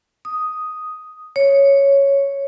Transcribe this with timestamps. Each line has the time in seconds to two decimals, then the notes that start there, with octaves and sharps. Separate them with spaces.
0.25 D#6
1.36 C#5